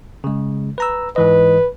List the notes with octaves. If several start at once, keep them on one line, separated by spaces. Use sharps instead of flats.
C#3 G#3
B4 A#5 E6
G#2 E3 B4 D#5